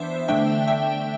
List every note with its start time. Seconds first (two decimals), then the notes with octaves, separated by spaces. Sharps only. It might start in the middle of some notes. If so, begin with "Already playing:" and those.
Already playing: E3 B3 D4 C5 E5
0.28 D3 A3 D4 E5 G5
0.67 E5 G5